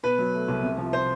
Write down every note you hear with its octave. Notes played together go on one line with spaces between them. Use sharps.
B2 B4
F#3
A3
C2
C3
F3
C5